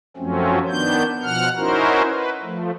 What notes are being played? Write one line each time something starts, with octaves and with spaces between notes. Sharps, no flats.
F#2 F3 F#3 A3 C4 C#4
D#3 B3 D4 G6
B2 F3 F#5 F6
C#4 D#4 E4 F#4 A#4 C5
B4
F3 A3